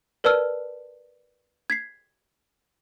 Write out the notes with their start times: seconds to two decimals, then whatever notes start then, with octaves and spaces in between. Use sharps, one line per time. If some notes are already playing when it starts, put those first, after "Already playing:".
0.24 A#4 B4 D5 A5 E6 F6
1.70 G#6 B6 C7